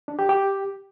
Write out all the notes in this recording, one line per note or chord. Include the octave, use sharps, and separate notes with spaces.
D4
G4
G4